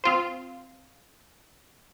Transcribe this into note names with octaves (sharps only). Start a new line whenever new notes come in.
C4 F4 C5